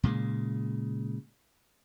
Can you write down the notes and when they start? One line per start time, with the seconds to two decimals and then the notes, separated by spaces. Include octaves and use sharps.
0.03 A#2 C#3 G#3